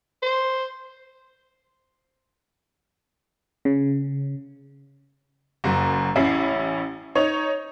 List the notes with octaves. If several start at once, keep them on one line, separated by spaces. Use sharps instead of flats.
C5
C#3
F#1 F#2
A1 C#4 E4 C7
D#4 C#5 F7